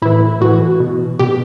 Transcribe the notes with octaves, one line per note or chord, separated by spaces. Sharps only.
A2 E3 E4
A2 E3 F#4
B2
B2 G4